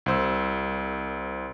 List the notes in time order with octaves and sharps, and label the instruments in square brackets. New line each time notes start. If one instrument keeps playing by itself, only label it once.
[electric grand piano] C2 C5 E6